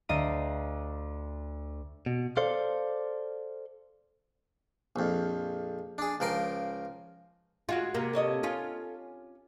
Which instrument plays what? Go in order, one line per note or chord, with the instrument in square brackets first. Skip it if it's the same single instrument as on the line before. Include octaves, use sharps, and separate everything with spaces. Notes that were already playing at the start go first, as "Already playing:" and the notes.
[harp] D2 D4 D#5 F5 A#5 D#7
[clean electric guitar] B2
A4 C5 D5 F5
[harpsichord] A#1 F2
D4 G#4
C#2 F3 A#4 G5 C6
[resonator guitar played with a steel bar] G#3 F#4 G#4 [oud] F4
[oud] C3 A#3
[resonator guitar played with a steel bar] A4 C#5 D#5
[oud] C#4 F4